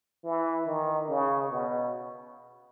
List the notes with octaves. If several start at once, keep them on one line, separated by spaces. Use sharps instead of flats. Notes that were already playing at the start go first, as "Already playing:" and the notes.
E3
D#3
C#3
B2